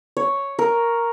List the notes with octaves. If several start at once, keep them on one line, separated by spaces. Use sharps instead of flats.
C#5
A#4